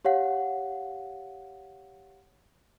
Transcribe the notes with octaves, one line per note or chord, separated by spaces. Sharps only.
G4 C#5 F5 F#5